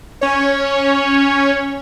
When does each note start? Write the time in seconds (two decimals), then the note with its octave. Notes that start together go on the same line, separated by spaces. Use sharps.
0.21 C#4 C#5